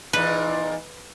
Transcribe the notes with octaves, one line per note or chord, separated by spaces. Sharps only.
E2 A#2 D#4 B4